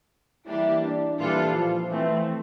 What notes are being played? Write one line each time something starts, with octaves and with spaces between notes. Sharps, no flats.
E3 G3 A#3 D4 E4 G4
D4
A#2 E3 G3 D4 F4 A4
F3
E3 F3 A3 C4